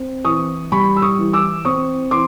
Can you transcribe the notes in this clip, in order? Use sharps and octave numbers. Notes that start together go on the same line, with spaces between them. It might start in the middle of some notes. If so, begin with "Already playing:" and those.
Already playing: C4
E3 C#6 D#6
G3 B5 C#6
E6
C#6 D#6
E3
D6 E6
C4 C#6 D#6
E3 C6 D6